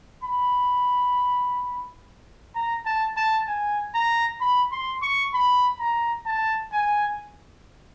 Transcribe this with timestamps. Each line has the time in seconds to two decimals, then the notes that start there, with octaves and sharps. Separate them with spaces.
0.23 B5
2.55 A#5
2.86 A5
3.17 A5
3.48 G#5
3.94 A#5
4.41 B5
4.72 C6
5.02 C#6
5.33 B5
5.80 A#5
6.26 A5
6.72 G#5